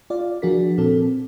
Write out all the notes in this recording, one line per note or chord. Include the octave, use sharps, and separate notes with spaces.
F4 D5 F5
F3 D4 F#4 G#4 A#4 B6
A#2 C4 A4